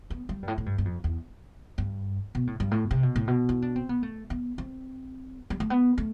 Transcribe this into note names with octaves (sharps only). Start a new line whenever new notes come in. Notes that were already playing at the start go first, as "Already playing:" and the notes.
B3
G3
G2
A2
A2
G2
G2
F2
E2
G2
B2
A2
G2
A2
C3
B2
A2
B2
E4
D4
C4
B3
A3
B3
C4
G3
A3
B3
A3